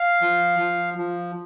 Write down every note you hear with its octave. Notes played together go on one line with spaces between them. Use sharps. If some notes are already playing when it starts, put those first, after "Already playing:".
Already playing: F5
F3
F3
F3